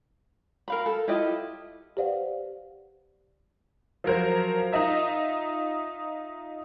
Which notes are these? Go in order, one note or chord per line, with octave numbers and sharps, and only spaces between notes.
A#4 F5 B5
A4
E4 F4 G4 D#5
G4 B4 C5 D5 F5 F#5
F3 F#3 A#4 C5
D#4 F4 D#5 E5